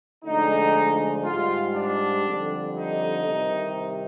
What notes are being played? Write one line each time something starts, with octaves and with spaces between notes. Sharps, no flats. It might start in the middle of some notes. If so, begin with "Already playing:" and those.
D2 D3 F3 G#3 D#4
G#2 G3 F4
D4
F2 D3 G3
D#4
C2 C3 D#3